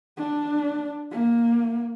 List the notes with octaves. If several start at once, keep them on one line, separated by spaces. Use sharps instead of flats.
D4
A#3